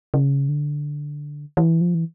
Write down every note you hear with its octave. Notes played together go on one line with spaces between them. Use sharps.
C#3
D3
E3
F3
E3